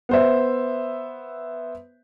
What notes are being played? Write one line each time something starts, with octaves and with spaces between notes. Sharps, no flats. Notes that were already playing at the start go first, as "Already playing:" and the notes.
B3 C5 E5